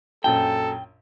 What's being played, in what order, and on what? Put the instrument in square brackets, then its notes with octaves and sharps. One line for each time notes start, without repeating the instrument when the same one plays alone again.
[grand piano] A#1 F#2 A5 [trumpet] A4 [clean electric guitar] G5